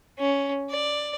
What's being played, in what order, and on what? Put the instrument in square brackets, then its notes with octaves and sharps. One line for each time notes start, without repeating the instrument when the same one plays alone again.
[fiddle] C#4
D5